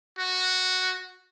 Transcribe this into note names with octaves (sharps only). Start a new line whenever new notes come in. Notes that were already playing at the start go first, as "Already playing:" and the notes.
F#4